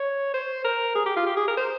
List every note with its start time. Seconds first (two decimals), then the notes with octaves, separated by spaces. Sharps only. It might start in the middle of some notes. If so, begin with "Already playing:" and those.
Already playing: C#5
0.34 C5
0.64 A#4
0.95 G#4
1.06 G4
1.16 F4
1.26 G4
1.37 G#4
1.48 A#4
1.57 C5